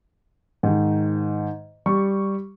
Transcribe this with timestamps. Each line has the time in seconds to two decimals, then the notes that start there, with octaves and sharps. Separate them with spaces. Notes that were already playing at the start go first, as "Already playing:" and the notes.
0.63 G#2 D#3
1.86 G3 C#6